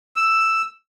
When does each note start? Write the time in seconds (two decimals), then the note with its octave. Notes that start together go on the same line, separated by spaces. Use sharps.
0.16 E6